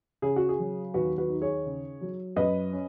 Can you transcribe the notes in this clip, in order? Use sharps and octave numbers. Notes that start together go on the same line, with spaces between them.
C#3 G#4
F#4
G#4
F#3
D#2 F#4 B4
F#4 B4
D#4
G#4 C#5
C#3
F#3
F#2 B4 D#5
C#4